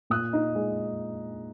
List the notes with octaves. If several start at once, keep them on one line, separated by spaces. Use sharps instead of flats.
A#2 D#6 F#6
D#4
G#3